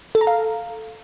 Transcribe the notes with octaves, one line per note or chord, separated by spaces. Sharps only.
A4
A#5
F5